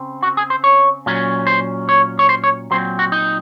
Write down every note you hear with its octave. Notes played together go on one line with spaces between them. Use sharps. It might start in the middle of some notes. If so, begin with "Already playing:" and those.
Already playing: C#3 C4
F#4
G#4
C5
C#5
A#2 F#3 C#4
C5
C#5
C#5
C5
C#5
A#2 F#3 C4 C5
F#4
D#4